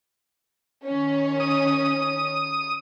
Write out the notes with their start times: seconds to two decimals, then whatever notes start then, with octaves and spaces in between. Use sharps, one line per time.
0.85 D#3 C#4
1.40 D#6